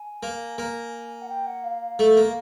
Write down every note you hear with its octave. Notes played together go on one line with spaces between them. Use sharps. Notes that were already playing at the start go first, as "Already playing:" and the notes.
Already playing: G#5
A#3
A#3
F#5
G5
F#5
F5
F5
A3
A#3